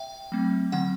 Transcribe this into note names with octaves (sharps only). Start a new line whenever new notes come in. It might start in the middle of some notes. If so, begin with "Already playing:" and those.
Already playing: E5 G5
F#3 A3 C4
D3 F#3 C4 F#5